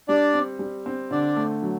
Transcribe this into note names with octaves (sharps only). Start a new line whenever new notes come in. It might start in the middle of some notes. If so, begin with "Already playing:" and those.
G3 D4 D5
C4
G3
C4
D3 D4 D5
A3
F#3